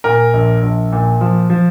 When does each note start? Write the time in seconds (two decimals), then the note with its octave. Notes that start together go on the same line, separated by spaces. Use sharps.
0.04 A#2 A#4
0.33 A#1
0.63 A#1
0.93 A#2
1.21 F3
1.50 F3